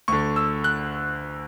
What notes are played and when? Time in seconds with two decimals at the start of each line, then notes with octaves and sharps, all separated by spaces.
0.08 D2 D3 C#6
0.36 E6
0.64 F#6